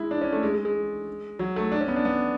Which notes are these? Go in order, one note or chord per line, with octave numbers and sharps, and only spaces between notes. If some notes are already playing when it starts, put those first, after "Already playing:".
Already playing: G#3 E4
D4
C#4
A3
G#3
G#3
G#3
F#3
A3
D4
C#4
B3
D4
B3